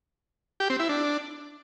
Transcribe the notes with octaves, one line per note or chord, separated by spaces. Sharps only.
G4
C4
E4
D4